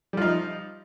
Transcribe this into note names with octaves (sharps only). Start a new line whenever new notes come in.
F3 G3 D#4